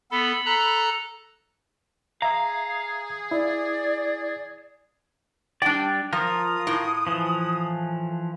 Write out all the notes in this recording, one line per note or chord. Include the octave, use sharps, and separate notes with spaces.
B3 A4 B5
A4 A#5 F#6
G#4 E5 F5 A#5
E4 D5
G3 D4 D5 G5
F3 F4 A#4 D#6
A2
E3 F3